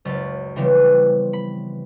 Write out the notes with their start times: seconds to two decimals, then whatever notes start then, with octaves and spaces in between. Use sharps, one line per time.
0.05 F#1 C#2 A6
0.56 C#3 E3 F3 G3 B3 C4
1.33 B5